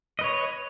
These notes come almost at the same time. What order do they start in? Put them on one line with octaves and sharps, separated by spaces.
D#5 B4 C#5